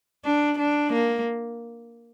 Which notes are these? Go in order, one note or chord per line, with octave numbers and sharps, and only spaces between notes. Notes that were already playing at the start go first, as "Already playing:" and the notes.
D4
D4
A#3